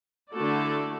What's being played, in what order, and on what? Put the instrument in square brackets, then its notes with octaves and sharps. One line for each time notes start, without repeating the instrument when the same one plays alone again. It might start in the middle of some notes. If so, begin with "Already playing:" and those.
[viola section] D3 A3 E4 F#4 A4 D5